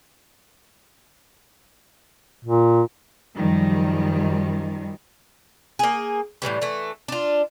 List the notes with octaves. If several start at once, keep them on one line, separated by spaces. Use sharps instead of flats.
A#2
F#2 D#3 F3 G3
A#3 G#4
A2 D#3 E3 G3
E3 A3
D4 F4